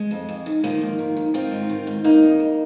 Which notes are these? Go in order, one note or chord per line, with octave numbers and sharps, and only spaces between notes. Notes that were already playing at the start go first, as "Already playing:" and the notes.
Already playing: G#3
F2
F2
D#3
D#3 F3 A#3
G#2
D#3
D#3
D#3 C4 F4
G#2
D#3
G#2
F2 A#3 D#4
F2
F2